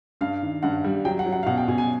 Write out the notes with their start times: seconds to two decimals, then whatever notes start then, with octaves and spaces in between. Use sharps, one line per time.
0.21 G2 F5
0.42 D#3
0.63 G2 F#5
0.84 G3
1.05 F#3 G5
1.19 F#5
1.26 F#3
1.32 F#5
1.43 F5
1.46 B2 F#5
1.57 G5
1.68 B2 G#5
1.78 G#5